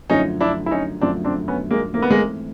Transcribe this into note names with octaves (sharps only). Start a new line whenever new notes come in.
F#2 D3 F3 A3 C#4 D#4
D4 E4
E4
C#4 D#4
F#2 D3 F3 A3 C4 D4
C4 D4
B3 C#4
G#3 A#3
G#2 E3 A3 A#3 C4
B3
G#3 A#3